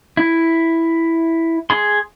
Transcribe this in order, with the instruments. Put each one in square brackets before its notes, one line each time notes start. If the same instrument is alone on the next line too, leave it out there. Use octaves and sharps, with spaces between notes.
[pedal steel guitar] E4
G#4 C6